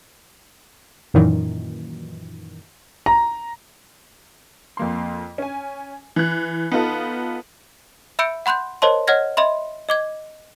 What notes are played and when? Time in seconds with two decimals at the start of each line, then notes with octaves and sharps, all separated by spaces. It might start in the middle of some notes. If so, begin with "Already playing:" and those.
1.14 F#2 A#2 D#3 E3
3.06 A#5
4.77 F2 A#3 C6
5.38 C#4 G#5
6.16 E3 F#6
6.72 B3 D#4 F4 A4
8.19 E5 B5 E6 G6 C#7 D7
8.46 F#5 B5 C6 F#6 G6
8.82 A#4 C5 C#5 D#5 A5 C6
9.07 C#5 D#5 F#5 F6 G#6 A#6
9.37 D#5 E5 B5 C6
9.89 D#5 D6 G#6